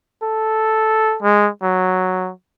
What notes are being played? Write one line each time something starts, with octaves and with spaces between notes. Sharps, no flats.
A4
G#3
F#3